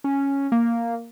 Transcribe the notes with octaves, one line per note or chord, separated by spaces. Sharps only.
C#4
A#3